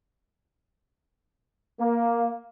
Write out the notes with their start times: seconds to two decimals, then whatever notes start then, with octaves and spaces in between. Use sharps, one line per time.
1.80 A#3